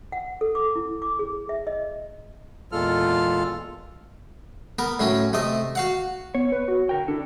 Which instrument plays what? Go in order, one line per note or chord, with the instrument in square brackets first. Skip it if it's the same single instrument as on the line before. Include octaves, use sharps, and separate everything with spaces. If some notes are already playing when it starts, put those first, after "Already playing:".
[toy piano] F#5
A4
D6
E4
D6
G#4
E5
D#5
[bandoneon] E2 A#2 G#3 F4 A4 F6
[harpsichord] B3 A#4
A2 F#3 C#4
C3 A3 D#5
F#4 F5 F#5
[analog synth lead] B3 [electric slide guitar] C#5
[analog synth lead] B4
F#4
[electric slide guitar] D3 A#4 G5
[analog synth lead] D4 [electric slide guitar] E4 A4